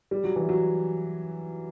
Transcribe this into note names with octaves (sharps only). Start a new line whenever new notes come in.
G3
F#3
E3
F#3